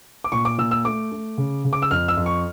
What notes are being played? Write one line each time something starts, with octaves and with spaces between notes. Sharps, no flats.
D6
A#2 C#6
D6
A#2 E6
E6
A3 D6
A3
C#3
C#3
D6
E6
F2 F6
E6
F2
C#6